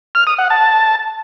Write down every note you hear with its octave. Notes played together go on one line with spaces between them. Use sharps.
F6
D#6
F#5
A5